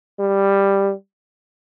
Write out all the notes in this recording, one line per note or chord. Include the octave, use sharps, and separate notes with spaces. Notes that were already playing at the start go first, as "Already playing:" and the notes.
G3